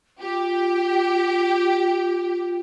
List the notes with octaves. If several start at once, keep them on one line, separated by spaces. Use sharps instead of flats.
F4 G4